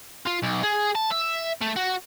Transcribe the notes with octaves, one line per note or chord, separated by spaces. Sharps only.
F4
B1
G#4
A5
E5
A3
F#4